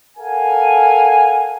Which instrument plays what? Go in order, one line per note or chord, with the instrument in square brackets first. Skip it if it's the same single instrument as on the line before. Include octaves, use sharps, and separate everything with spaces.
[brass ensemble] A4 A#4 F5 F#5 G#5